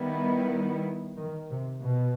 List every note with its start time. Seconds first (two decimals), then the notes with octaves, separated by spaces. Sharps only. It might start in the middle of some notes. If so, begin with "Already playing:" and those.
Already playing: D#3 G3 B3 E4
1.17 D#3
1.50 C3
1.83 B2